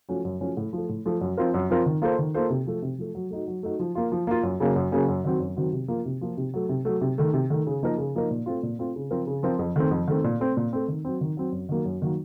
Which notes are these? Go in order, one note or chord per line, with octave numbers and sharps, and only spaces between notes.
F3 A3 C#4 F#4
F#2
F3 A3 C#4 F#4
A2
F3 A3
A2
F3 A3
F#2
F3 C4 F4 A#4
F#2
F3 C4 F4 A#4
D#3
A#3 F4 A4 C5
D#3
A#3 F4 A4 C5
C3
F3 A3
C3
F3 A3
F#3
A3 D#4 F#4
F#3
A3 D#4 F#4
F3
A#3 F4
F3
A#3 F4
F#2
C#3 F#3 A#3 C#4
F#2
C#3 F#3 A#3 C#4
F#2
D#3 F#3 C4 F#4
F#2
D#3 F#3 C4 F#4
C3
F3 A#3 F4
C3
F3 A#3 F4
C3
F#3 A3
C3
F#3 A3
C3
D#3 A3
C3
D#3 A3
C#3
F3 A#3 D#4 A#4
C#3
F3 A#3 D#4 A#4
A#2
A3 C4 F4
A#2
A3 C4 F4
C#3
F3 C4 F4 A#4
C#3
F3 C4 F4 A#4
F2
D#3 A3 C4
F2
D#3 A3 C4
A#2
A3 C4
A#2
A3 C4
D#3
F#3 C4
D#3
F#3 C4
F#2
D#3 F#3 A#3
F#2
D#3 F#3 A#3